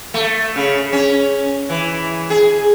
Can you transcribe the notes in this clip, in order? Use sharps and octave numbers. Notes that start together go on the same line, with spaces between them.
A3
C#3
C#4
E3
G#4